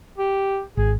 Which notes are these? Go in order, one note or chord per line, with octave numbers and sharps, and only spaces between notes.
G4
G#1 G#4